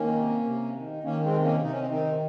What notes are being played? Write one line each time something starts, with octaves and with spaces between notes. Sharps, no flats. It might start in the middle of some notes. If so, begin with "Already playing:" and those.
Already playing: D#3 A#3 C#4
C3
C3
D#3
D#3 A#3 C#4
G#3 C4
C3
A#3 C#4
C3 D#4
C#4
C4 D#4
D#3 C4 D#4